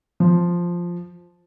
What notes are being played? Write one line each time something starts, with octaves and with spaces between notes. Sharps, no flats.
F3